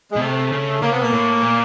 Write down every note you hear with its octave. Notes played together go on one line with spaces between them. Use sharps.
B2 G#3
C3 A3
C#3
C#3 A#3
C3 B3
B2 A#3
A2
A#2